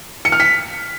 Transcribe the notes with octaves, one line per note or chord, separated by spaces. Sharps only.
C#7
F6
B6